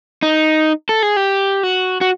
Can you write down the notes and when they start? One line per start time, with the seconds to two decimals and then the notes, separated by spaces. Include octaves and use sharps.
0.22 D#4
0.89 A4
1.03 G#4
1.17 G4
1.63 F#4
2.01 F#4